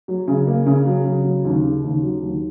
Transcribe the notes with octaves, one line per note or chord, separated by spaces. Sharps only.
F#3
C#3
A#3
C#3
F#3
C#3
F#3
D#2
C#3
D#2
F#3
D#2